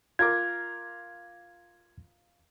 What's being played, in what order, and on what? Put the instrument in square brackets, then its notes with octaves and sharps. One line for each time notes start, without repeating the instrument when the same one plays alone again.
[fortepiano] F4 A#4 D6 [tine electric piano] G#6